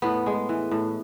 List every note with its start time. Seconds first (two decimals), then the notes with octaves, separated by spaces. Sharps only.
0.02 A2 B3
0.26 G#3
0.49 E3
0.71 A2